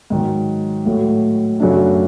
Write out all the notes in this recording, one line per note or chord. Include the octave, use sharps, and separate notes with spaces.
G#2 D#3 F#3
A2 F#3 A3
F#2 C#3 F#3 A3 D4